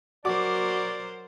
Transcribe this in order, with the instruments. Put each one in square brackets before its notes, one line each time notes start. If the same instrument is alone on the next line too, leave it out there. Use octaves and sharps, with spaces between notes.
[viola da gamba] F#3 A#4 C5 [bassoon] F#4 [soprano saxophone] D5 [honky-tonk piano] D6